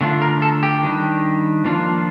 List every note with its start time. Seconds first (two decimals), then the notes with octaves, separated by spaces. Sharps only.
0.01 D3 A3 D4 F4
0.22 A#4
0.42 A4
0.63 G4
0.83 D#3 G3 D4
1.64 F3 A#3 D4 F4